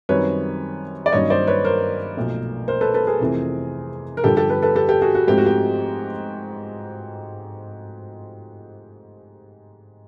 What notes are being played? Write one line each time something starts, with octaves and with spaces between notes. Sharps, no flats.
F#2 D#3 G3 C4 B4 C#5
D5
G2 D#3 F#3 A#3 C#4 C#5 D#5
C5 D5
B4 C#5
A#4 C5
B1 A#2 F3 A3
A#4 C5
A4 B4
A4 B4
G#4 A#4
F2 C3 E3 A3 C4
A#4
G2 D3 F3 G4 A4
G4 A4
A4 B4
A4 B4
G4 A4
G4 A4
F#4 G#4
F#4
G#2 F3 A3 C4 G4
F#4
G4